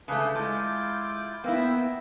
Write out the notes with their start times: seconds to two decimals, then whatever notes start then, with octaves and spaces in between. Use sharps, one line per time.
0.08 C#3 A3 D4 G#4 B4 G6
0.35 G#3 E4 F4 D6
1.44 A#3 B3 E4 G5 E6